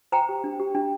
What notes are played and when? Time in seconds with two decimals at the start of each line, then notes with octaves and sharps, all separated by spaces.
0.12 C5 G5 A#5
0.29 G4
0.44 D4
0.59 G4
0.75 D4